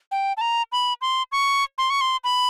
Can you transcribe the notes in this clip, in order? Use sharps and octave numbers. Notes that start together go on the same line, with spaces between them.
G5
A5
A#5
B5
C6
C#6
C6
C#6
C6
B5